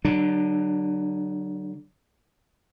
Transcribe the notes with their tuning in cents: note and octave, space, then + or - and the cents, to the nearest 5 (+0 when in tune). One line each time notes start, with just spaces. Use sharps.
D3 +0 F#3 +35 D4 +35